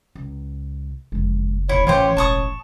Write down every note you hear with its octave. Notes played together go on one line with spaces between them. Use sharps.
C#2
F#1 F2 G#3
D#1 D3 E4 C#5
A1 E3 C#4 F4 G4 C5 C#5
E1 A5 C#6 D#6